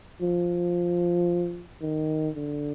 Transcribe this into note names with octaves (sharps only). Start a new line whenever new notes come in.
F3
D#3
D3